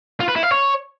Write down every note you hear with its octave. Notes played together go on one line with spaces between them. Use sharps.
F4
B4
E4
F5
C#5